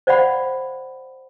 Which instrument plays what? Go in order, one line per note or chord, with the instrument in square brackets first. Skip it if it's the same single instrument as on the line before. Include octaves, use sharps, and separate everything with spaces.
[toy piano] C5 D5 F5 F#5 B5